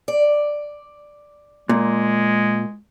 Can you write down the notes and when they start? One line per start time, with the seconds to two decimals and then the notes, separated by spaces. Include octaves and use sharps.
0.08 D5
1.69 A#2 G#3